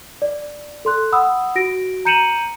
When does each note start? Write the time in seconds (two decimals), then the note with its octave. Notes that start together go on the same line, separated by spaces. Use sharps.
0.22 D5
0.85 A4 C6 F#6
1.12 F#5 B5 D#6 E6
1.55 F#4 A#6 D7
2.05 A#5 G6 C#7 D#7 E7 F#7